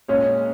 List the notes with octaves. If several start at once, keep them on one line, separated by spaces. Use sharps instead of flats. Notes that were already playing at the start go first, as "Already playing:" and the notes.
A#2 G#3 C#4 G#4 C#5